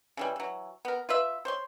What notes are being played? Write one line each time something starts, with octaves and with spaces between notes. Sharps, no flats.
C#3 E3 G3
E3 F#3
B3 A#4
F4 B4 E5
C5 C#5 C6